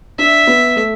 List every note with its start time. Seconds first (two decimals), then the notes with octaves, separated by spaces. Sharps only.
0.19 D4 E5
0.47 B3
0.76 A3